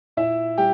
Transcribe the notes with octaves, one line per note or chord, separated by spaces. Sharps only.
A#2 E4 E5
G3 G4 G5